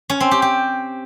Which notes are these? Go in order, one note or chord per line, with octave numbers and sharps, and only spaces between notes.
C#4
C4
G4
G4